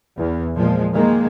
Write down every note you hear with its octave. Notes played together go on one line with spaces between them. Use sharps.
E2
A#2 F3 G#3
D#3 G#3 A#3